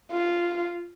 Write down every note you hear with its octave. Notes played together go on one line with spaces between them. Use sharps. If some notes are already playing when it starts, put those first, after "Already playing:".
F4